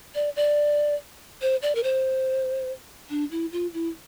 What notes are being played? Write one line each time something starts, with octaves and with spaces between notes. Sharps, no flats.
D5
D5
C5
D5
A#4
C5
D4
E4
F4
E4